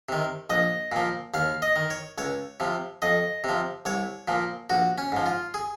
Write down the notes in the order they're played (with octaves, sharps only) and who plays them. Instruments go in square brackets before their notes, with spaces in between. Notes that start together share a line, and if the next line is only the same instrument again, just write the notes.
[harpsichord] C3 D#3
A#1 D#5
A#2 F3
D#2 F5
D#5
D#3
C#5
C#2 C#5
C3 F3
F2 D#5
C3 F3
C2 C#5
A#2 F3
A#1 F#4
C#4
G#2 F3
F4
G#4